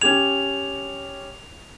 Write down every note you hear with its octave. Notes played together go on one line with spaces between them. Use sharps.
C#4 G4 G#6 F7